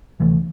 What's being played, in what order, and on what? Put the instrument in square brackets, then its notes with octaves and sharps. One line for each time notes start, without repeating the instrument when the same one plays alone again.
[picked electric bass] D2 C3 E3 A3